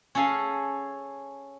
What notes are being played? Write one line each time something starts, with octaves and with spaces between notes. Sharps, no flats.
C#4 G#4 A4 F5 G#5